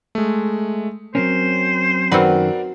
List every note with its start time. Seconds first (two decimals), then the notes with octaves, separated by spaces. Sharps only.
0.15 G#3 A3
1.15 F#3 C4 C#4 A#4 C5
2.12 F#2 D#3 C4 F#4 A#4 B4 D5 F#5